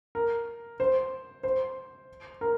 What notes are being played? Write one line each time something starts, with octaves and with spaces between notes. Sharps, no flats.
A#4
C5
C5
A#4